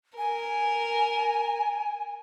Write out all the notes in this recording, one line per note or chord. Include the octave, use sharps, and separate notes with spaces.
A#4 G#5